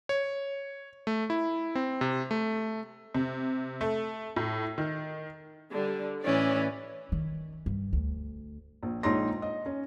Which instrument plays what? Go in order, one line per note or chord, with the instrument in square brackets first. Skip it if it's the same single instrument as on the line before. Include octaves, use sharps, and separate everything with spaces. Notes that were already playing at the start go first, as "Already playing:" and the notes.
[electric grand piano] C#5
A3
E4
C4
C3
A3
[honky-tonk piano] C3
A3
A2
D#3
[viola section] D3 G3
[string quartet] A2 E3 C#4 [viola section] D5
[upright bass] D#3
G2
D2
[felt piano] A#1
A#1 G#3 D#4 C#5 C6 A#6
D#5
C#4